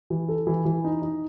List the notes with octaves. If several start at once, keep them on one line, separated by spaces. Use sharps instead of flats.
E3
A4
E3
E3
D#4
D#4